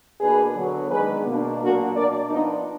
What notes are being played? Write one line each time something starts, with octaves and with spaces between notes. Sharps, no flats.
B2 A#3 D4 G#4 B4
D3 F#3 B3
D#3 G#3 B3 D4 G#4 B4
B2 A#3 D4
A#2 F#3 A#3 D4 F#4 A#4
B2 A#3 D4 A#4 D5
F3 B3 D4 D#4